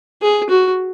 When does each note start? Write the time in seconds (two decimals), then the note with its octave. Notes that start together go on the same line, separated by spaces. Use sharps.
0.22 G#4
0.50 F#4